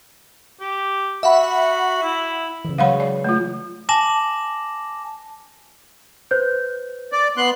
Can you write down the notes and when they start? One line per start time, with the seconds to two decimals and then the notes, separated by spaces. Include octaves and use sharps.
0.61 G4
1.23 F#4 E5 F#5 B5
2.03 E4
2.65 C#3 E3
2.78 F#3 G#3 C#5 F5 F#5 B5
3.00 D5
3.24 A3 F4
3.89 G#5 A5 D6 A#6 E7 F#7
6.31 B4 C5 G6
7.12 D5
7.37 B3 C6 F#6